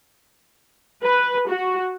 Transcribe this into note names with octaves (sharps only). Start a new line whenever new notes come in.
B4
F#4